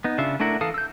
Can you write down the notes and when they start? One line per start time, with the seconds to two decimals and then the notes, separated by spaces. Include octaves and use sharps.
0.04 B3 D#4
0.18 C#3 D4 F4 E5
0.40 A3 D4 E4 A#4 F#5
0.61 E3 A4 F5 A5 D#6
0.74 E6 G6